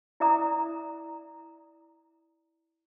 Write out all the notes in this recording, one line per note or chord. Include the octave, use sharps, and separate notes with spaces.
E4 D5 E5 A#5 D#6